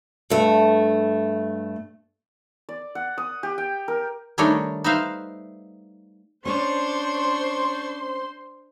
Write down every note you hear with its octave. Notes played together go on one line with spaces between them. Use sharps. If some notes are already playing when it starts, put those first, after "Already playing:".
G2 A3
D5
F#5
D#6
G4
G5
A#4
D#3 G3 A3 D4 D#4 C#5
D#4 B4 C5 E5 F5
C#4 D4 C5 C#5 C6 C#6